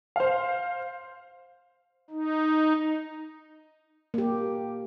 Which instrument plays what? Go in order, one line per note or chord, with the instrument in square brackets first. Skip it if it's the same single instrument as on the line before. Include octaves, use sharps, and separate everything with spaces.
[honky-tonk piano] C5 F5
[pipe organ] D#4
[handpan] A#3 G4